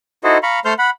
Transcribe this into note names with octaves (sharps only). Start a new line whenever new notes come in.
D#4 E4 F#4 A4 C5 D#5
F5 A#5 B5 C#6
A3 A4 C5 C6 F6 G6
F#5 B5